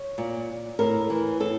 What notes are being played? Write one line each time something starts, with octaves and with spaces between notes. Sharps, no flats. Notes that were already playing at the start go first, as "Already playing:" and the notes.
Already playing: C#5
A#2
A2 A#4
E3
A2 A4